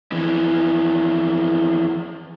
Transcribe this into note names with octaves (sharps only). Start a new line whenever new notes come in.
F2 E3